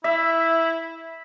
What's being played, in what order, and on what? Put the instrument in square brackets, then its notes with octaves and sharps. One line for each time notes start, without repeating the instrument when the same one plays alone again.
[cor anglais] E4 [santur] E5